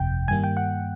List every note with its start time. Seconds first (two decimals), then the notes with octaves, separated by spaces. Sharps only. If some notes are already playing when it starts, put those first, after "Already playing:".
Already playing: G1 F2 C3 G5
0.28 G2 D#3 G3 A#3 G#5
0.44 G5
0.57 F#5